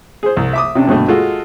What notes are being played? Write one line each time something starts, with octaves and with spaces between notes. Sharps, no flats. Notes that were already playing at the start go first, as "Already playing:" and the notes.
G#4 C5
C2
E5 D6 D#6
C3 C#4 D4
G2 B2 D3 A3
G#3 F4 F#4 A4